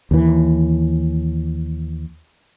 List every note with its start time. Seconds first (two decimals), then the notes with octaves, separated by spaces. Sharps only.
0.11 D#2 E3